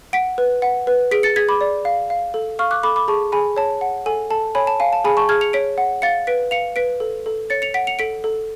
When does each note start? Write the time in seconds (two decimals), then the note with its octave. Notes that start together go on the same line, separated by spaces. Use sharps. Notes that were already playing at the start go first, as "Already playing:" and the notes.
0.13 F#5 B6 D7
0.38 B4
0.62 F#5
0.87 B4
1.11 G#4 B6 D7
1.23 A6 C#7
1.36 G#4 G#6 B6
1.49 B5 D6
1.61 D5
1.85 F5
2.10 F5
2.34 A4
2.59 F5 C#6 F6
2.71 D6 F#6
2.83 A4 B5 D6
2.96 B5 D6
3.08 G#4 A5 C#6
3.32 G#4 G#5 B5
3.57 C#5 A5
3.81 F#5
4.06 A4 G#5
4.30 A4 A5
4.55 C#5 G#5 B5
4.67 A5
4.80 F5 G#5
4.93 A5
5.05 G#4 G#5 B5
5.17 A5 C#6
5.29 G#4 F6 G#6
5.41 C#7 F7
5.53 C#5 B6 D7
5.78 F#5
6.02 F5 A6 C#7
6.27 B4 B6 D7
6.51 F5 C#7 F7
6.76 B4 B6 D7
7.00 A4
7.26 A4
7.50 C#5 A6 C#7
7.62 C#7 F7
7.74 F#5 B6 D7
7.87 C#7 F7
7.99 A4 B6 D7
8.24 A4